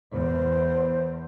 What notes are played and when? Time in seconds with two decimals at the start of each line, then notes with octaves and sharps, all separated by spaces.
0.14 E2 C5